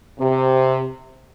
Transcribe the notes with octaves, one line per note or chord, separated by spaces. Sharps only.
C3